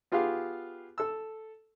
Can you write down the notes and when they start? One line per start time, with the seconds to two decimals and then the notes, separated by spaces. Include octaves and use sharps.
0.12 B3 F4 G4 G#4 F5
0.98 A4 E6